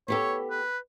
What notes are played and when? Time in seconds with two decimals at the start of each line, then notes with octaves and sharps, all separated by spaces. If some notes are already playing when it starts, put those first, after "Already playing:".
0.08 B3 G4 A4 C#5
0.50 B4